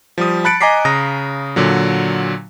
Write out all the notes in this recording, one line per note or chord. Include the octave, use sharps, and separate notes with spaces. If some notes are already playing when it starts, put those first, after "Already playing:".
F3 G3 D#6
A5 B5 F#6 A6 C#7 D7
D#5 G#5 A#5 D6 B6 C7
C#3 A#5 D#6 A#6
A#2 D3 F#3